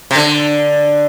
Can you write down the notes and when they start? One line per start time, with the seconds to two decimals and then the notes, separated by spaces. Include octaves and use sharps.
0.11 C3
0.16 D3